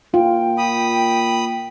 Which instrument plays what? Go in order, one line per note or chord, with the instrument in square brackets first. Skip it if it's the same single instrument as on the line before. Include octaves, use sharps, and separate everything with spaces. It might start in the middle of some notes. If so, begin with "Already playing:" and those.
[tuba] A#2 [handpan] F4 [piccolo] G5
[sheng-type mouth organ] B5 D#6